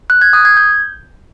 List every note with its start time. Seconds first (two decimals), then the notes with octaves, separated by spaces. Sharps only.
0.10 F#6
0.21 G#6
0.33 D#6
0.45 G#6
0.57 G6